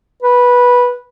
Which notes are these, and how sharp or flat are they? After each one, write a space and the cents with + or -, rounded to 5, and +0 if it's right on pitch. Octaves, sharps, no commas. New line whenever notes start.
B4 -10